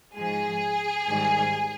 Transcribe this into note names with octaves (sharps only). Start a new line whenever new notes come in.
G#2 F3 G#3 G#4
G#2 D#3 G3